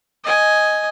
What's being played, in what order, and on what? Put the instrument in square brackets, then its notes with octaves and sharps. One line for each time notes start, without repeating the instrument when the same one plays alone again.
[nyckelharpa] D#5 G#5